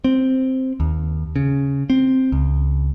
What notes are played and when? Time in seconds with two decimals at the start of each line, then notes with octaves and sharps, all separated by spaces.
0.04 C4
0.80 D#2
1.36 C#3
1.90 C4
2.32 C#2